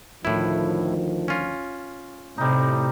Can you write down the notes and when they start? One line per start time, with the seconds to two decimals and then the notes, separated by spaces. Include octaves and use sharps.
0.25 D2 A2 D#3 F3 E4
1.28 C#4 F4
2.38 A2 C3 G3 D#4